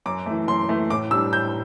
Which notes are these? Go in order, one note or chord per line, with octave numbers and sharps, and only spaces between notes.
F#2 D6
E3 A3
F#2 C6
E3 A3
A2 D6
G3 D4 E6
A2 G6